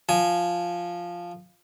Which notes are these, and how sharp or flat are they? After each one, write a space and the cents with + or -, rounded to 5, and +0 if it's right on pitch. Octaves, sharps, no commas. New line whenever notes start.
F3 +0 G#5 +0